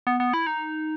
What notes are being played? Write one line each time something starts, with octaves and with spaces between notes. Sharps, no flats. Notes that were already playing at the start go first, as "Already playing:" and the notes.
B3
B3
E4
D#4